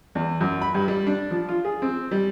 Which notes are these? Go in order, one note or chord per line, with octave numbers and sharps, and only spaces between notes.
E2
F#2
B5
G2
G3
D4
F3
F4
G#4
C4
G3